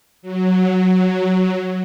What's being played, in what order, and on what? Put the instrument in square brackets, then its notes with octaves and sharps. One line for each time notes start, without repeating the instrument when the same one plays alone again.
[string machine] F#3